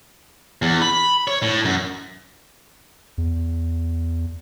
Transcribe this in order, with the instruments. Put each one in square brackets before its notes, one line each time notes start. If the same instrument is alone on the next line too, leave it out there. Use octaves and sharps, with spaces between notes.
[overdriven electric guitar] E2
B5
C#5
A2
F#2
[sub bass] E2